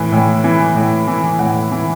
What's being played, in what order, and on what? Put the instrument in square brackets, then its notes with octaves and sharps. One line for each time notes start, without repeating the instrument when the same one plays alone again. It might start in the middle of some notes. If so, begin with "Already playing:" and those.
Already playing: [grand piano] A2 E3
A2
E3
A2
E3
A2 F#5
E3